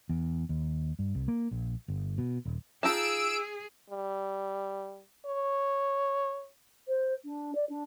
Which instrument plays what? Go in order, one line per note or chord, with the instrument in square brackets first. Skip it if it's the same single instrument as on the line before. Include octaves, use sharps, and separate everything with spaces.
[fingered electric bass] E2
D#2
G2
C2
A#3
A#1
G1
B2
D#1
[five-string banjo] D#4 F4 A5 [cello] G#4 [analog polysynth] E6 D7
[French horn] G3
C#5
[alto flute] C5
D4
D5
D4